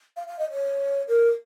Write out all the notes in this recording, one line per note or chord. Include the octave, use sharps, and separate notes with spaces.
F5
F5
D#5
C#5
A#4